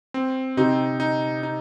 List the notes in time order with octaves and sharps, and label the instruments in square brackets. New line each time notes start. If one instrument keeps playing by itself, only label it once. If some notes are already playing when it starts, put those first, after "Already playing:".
[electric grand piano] C4
[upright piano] C3 [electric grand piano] D#4
[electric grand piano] D#4
D#4